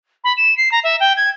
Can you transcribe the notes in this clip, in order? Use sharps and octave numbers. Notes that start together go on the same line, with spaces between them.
B5
E7
C7
A#5
E5
G5
G#6